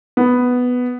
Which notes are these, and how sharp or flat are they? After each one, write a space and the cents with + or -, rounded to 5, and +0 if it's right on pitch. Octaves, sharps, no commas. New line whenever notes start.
B3 +5